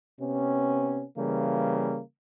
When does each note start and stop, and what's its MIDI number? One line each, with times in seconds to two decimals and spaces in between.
0.20 1.03 48
0.20 1.03 59
0.20 1.03 61
1.17 2.00 49
1.17 2.00 52
1.17 2.00 55
1.17 2.00 58